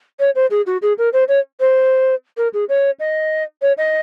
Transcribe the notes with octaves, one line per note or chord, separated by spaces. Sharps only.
C#5
C5
G#4
F#4
G#4
A#4
C5
C#5
C5
A#4
G#4
C#5
D#5
C#5
D#5